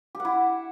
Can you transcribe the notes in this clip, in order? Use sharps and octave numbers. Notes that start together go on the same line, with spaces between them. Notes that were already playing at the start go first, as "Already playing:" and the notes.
G4
F#5
E4